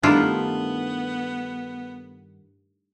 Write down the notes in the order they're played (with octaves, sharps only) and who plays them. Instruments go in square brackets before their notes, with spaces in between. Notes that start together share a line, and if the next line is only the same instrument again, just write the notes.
[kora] G2 D#3 A3 [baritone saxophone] B3 [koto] D4 E4 F4